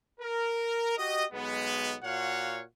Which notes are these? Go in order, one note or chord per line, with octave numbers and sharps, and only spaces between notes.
A#4
F#4 G4 D#5
B1 G#3 B3
A#2 F#4 C#5 F5 F#5